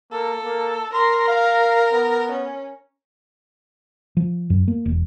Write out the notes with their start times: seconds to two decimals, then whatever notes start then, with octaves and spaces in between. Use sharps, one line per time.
0.12 A#3 A4
0.44 A#3
0.94 A#4 C6
1.28 F5
1.92 B3
2.31 C#4
4.17 F3
4.50 F#2
4.68 A#3
4.85 E1